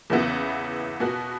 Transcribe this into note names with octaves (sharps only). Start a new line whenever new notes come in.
E2 C#3 E3 B3 E4
B2 B3 F#4